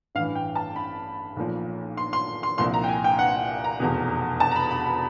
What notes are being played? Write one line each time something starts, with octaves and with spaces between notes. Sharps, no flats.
A1 G2 E3 F5
G5
A5
B5
B1 A#2 F3
C6
C6
C6
C2 A#2 F3 C6
A#5
G5
G#5
G5
F#5
A#5
F1 E2 B2
A5
A#5
B5
B5
B5